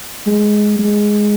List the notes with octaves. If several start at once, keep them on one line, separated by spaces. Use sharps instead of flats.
G#3
G#3